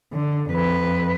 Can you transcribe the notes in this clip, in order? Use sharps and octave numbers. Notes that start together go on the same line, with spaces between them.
D3
F2 B4